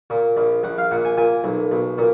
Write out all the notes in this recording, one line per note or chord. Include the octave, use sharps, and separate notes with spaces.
A#2
A#1
A#1 F#5
F5
A#2 F#5
G#5
A#2 G#5
B1
B1
A#2